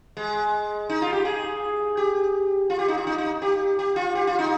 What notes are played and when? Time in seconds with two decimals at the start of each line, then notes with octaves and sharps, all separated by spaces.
0.17 G#3
0.89 D#4
1.02 F4
1.13 G4
1.25 G#4
1.97 G4
2.70 F4
2.79 G4
2.88 D#4
2.97 F4
3.07 D#4
3.18 D#4
3.42 G4
3.79 G4
3.96 F4
4.15 G4
4.27 F4
4.39 D#4